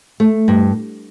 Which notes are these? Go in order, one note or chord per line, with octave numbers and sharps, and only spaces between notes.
A3
G2